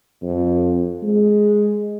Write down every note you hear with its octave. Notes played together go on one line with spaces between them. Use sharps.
F2
G#3